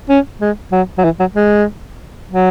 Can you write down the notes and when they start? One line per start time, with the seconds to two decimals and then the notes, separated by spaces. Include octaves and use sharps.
0.09 C#4
0.41 G#3
0.72 F#3
0.98 F#3
1.04 E3
1.20 F#3
1.36 G#3
2.31 F#3